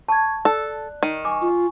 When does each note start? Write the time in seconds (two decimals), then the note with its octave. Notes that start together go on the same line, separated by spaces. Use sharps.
0.08 A5 C#6 G#6
0.45 A4 D5 F#6
1.03 D#3
1.25 G#5 C#6 D6
1.42 F4